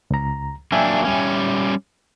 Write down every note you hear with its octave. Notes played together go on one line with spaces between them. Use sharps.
C#2 A#5
F#3 A#3 D4 E5 G5 G#5
G3 C#4